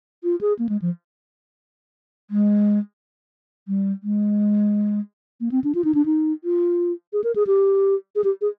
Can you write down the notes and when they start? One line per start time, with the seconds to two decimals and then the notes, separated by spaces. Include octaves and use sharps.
0.24 F4
0.41 G#4
0.59 A#3
0.69 G#3
0.82 F3
2.31 G#3
3.68 G3
4.03 G#3
5.41 A#3
5.52 C4
5.64 D4
5.75 F4
5.84 D#4
5.95 D4
6.05 D#4
6.44 F4
7.13 G#4
7.24 A#4
7.35 G#4
7.47 G4
8.15 G#4
8.24 G4
8.41 G#4